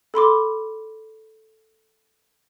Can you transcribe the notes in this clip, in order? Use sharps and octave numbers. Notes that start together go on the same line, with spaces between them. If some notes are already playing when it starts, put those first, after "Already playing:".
A4 B5 C6 D6